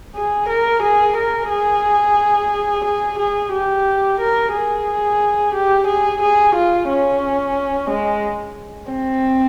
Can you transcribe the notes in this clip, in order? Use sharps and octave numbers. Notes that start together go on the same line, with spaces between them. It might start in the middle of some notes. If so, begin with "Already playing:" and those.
G#4
A#4
G#4
A#4
G#4
G#4
G#4
G4
A#4
G#4
G4
G#4
G#4
F4
C#4
G#3
C4